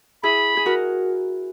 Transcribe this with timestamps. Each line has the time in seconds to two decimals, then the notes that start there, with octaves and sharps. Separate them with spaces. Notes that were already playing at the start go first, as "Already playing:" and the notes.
0.23 E4 G#4 B5
0.57 G#4
0.66 F#4 A#4